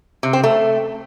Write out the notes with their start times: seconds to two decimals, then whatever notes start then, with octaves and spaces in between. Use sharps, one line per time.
0.23 C3
0.33 C4
0.43 A3